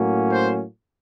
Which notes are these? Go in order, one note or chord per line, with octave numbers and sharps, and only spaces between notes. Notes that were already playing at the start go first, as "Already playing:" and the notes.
Already playing: A2 F#3 A#3 C#4
C5